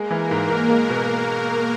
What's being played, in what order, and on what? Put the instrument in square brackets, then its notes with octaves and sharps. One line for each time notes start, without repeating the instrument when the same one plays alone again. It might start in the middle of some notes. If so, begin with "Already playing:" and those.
Already playing: [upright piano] G#3 [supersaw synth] A#3 A#4
[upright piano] E3
G#2
G#2
[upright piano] G#3 [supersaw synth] A#3 A#4
[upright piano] B2